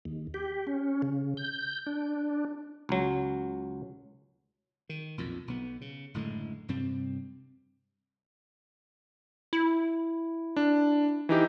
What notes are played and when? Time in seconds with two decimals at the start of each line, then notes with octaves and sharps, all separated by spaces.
0.05 D#2
0.34 G4
0.67 C#4
1.02 C#3
1.37 G6
1.87 D4
2.89 C#2 F#3
4.89 D#3
5.17 B1 F2 A#2
5.48 B1 B3
5.81 C#3
6.14 F#1 A2 D3 G#3
6.68 G2 C3 G3 C4
9.53 E4
10.56 D4
11.29 E3 D#4 G4